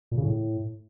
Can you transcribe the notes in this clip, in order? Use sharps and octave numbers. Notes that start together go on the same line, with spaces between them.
A#2
C#3
A2